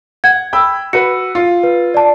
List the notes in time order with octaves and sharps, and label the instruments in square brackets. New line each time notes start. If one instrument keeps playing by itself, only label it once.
[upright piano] F#5 [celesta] G#6
[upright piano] G5 B5 E6
[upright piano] F#4 B4 [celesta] C#7
[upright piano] F4
[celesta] B4
D5 A5